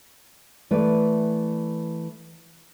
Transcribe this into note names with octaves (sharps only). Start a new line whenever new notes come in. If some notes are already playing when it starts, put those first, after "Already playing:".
E3 A3 B4 D5